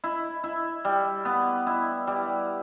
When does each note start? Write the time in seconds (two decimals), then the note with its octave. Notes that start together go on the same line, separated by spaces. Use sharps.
0.04 E4
0.43 E4
0.85 G3
1.25 B3
1.67 E4
2.07 G3